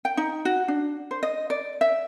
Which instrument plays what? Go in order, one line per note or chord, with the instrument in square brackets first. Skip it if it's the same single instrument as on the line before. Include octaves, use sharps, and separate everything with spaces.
[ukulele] G5
D#4
F#4
D4
C5
D#5
D5
E5